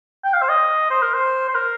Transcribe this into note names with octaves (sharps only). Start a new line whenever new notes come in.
G5
F5
C5
D#5
C5
A#4
C5
C5
A#4